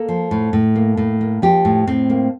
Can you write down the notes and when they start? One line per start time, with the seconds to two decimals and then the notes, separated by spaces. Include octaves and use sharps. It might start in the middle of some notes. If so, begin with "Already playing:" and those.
Already playing: A#3 A4
0.08 F3
0.31 A2
0.53 A2
0.75 A#3
0.97 A2
1.21 A#3
1.42 F3 G4
1.65 A2
1.87 A2 C4
2.10 A#3